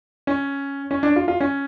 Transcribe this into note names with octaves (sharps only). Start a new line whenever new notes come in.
C#4
C#4
D4
F4
F4
C#4